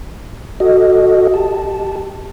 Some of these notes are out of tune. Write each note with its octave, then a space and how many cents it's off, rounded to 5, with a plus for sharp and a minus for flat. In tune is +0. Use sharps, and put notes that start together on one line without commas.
F#4 +0 A4 +0 D#5 +0
G4 +0 A5 +0